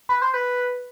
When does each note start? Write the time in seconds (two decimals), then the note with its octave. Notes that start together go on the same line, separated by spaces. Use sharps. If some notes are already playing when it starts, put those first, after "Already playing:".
0.09 B4
0.22 C5
0.34 B4